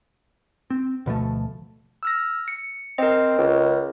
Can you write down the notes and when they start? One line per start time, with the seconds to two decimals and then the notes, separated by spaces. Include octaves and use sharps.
0.70 C4
1.06 D2 B2 F3 A3
2.03 E6 F6 A#6
2.48 C#7
2.98 C4 A#4 D#5
3.38 C#2